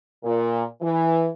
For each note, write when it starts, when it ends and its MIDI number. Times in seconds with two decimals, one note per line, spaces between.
0.23 0.63 46
0.81 1.27 52